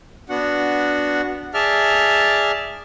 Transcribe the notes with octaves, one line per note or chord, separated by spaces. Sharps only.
B3 D4 F#4 F#5
G#4 D5 E5 A5 F6